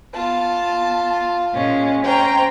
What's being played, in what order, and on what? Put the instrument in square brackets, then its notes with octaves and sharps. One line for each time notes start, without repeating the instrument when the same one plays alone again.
[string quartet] B3 A5 [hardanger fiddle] F4
[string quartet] A#2 G#3 C#4
[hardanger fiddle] C#4 [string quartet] C5 G5 A#5